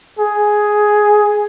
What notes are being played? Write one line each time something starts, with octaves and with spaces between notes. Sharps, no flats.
G#4